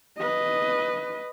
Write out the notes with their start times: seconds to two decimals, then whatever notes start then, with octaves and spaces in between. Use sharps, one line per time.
0.19 B4 D#5